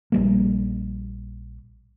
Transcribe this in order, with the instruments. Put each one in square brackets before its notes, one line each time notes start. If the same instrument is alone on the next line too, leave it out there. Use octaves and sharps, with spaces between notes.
[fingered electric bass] A#1 G3 A#3